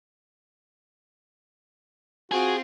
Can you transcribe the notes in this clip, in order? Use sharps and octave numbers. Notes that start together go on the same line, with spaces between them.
C4 F4 F#4 G#4